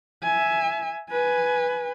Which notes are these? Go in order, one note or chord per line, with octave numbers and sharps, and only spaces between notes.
E5 G#5
B4 G#5